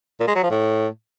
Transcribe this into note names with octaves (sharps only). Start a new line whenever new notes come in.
A#2
G#3
F#3
F3
A2